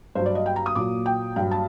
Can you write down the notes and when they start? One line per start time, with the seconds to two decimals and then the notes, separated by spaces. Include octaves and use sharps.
0.15 G2 F#3 C5
0.26 D5
0.35 D#5
0.46 G5
0.56 A#5
0.66 D#6
0.75 A#2 F#3 D6
1.06 G5
1.36 G2 F#3 G5
1.51 A5